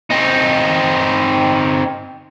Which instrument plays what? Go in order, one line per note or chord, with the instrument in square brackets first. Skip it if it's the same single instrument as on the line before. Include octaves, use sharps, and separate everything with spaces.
[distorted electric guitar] C4 D#4